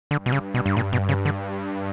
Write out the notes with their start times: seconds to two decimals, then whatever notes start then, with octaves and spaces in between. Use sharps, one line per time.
0.11 G2 D3
0.26 B2
0.32 C#3
0.54 B2
0.66 G2
0.77 A#2
0.93 B2
1.09 C#3
1.25 D3
1.42 G2